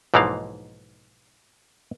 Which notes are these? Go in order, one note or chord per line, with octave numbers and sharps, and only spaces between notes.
B1 G#2 E3 F3 A#3 F5